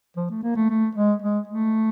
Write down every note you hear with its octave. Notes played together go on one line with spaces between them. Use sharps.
F3
A3
A#3
A3
A3
G#3
G#3
A3